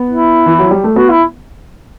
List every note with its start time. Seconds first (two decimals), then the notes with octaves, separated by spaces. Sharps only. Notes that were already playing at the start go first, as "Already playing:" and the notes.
Already playing: B3
0.10 E4
0.46 E3
0.59 F#3
0.71 G3
0.84 A3
0.96 B3 F#4
1.10 E4